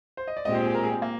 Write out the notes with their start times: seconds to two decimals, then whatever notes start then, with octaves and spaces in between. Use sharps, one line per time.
0.17 C5
0.28 D#5
0.37 D5
0.45 A#2 G#3 C4 G4 D#5
0.55 C5
0.65 G#4
0.75 A#4
0.83 G#4
0.92 C4
1.02 A#3